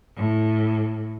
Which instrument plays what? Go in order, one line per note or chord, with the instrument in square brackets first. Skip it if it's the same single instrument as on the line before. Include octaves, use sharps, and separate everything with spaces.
[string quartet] A2